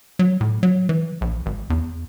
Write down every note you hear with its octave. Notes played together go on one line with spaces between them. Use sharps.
F#3
A2
F#3
E3
A#1
G#1
E2